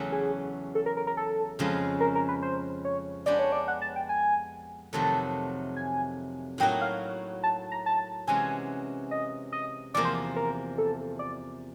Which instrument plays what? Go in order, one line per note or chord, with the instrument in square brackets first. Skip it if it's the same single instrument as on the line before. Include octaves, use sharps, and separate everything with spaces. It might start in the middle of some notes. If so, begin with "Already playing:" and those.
Already playing: [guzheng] E2 C#3 F#3 A3
[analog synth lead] G#4
A4
A#4
A#4
A#4
A4
[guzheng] F2 C#3 F3 G#3
[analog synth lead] A#4
A#4
B4
C5
C#5
[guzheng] G#3 B3 D4 G4 [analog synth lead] D5
[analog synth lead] C#5
D5
F#5
A5
G5
G#5
[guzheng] F2 C3 D#3 F#3 A3 [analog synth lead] A5
[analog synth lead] G#5
[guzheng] A2 F#3 A#3 D#4 F#4 [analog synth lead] G5
[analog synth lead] F5
A5
A#5
A5
[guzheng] C3 E3 G#3 C#4 F#4 [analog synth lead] G#5
[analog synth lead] D#5
D#5
[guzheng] E2 C3 F3 A#3 [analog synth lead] D5
[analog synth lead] C5
A#4
A4
D5